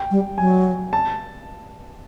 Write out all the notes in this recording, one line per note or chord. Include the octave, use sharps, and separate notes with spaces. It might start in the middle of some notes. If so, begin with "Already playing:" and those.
Already playing: G5
G3
F#3 G#5
A5